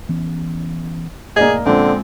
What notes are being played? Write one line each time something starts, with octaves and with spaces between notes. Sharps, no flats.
E3 B3 C#4
F1 A2 A#3 G#4 D5 D#5
A#1 D3 G#3 C4 C#4